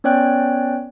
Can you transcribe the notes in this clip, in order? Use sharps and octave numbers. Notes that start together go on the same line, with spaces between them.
B3 C#4 C#5 D5 G5 F#6